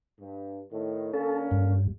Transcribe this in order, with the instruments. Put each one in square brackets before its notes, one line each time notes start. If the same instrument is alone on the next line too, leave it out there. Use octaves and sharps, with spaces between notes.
[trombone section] G2
A2 D#3
[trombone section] D3 A#3 C#4 [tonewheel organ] A4
[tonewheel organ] G2